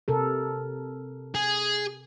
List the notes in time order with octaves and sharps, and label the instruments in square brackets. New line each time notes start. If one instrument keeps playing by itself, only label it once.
[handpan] C3 A4 A#4
[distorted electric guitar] G#4